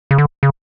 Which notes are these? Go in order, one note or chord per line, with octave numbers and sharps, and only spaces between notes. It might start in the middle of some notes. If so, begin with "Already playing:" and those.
C#3
D3
C#3